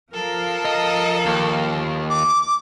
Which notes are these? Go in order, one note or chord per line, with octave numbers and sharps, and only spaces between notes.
F3 A4 A#4 F5
D#5
D#2
D6